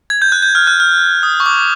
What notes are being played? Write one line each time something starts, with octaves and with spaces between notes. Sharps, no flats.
G#6
G6
F#6
G6
F6
F#6
F6
D#6
C#6
D6